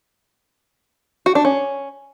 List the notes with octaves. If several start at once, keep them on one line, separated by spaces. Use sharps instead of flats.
F#4
D4
C#4